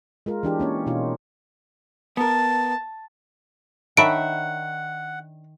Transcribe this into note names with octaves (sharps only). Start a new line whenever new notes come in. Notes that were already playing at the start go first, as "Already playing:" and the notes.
G#3 F4 A#4
E3 D4 G4
A#3 C#4 C#5
B2 D#4 F4
B3 A#4 A5
D#3 D4 C#5 E5 F#5 B5 D7